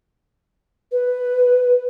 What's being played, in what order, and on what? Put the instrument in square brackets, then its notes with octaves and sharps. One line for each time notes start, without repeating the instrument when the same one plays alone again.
[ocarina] B4